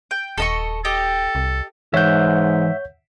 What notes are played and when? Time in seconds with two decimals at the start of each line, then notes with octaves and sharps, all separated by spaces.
0.11 G5
0.38 D#1 A4 D#5 C#6
0.85 G4 A4 D#5
1.35 C2
1.94 G#2 E3 C#5 E5 F#5 G6